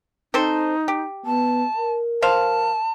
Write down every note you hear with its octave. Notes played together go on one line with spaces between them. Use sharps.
C4 D#4 A4 C5
G4
B3 A5
A#4
F3 C5 F5 A5